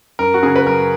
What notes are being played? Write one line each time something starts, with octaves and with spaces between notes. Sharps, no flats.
F#2 A#4
F#4
C#3 G#4
B4
F#2 A#4